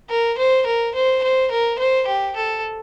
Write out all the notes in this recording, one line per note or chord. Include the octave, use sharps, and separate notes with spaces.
A#4
C5
A#4
C5
C5
A#4
C5
G4
A4